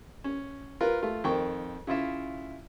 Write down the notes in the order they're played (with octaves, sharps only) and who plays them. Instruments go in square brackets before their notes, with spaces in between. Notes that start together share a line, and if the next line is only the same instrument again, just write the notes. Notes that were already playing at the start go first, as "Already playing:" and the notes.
[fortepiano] C#4
F4 A#4 B4
A3 F4
F2 D#3 G5 C#6
C#3 E4 F4 E5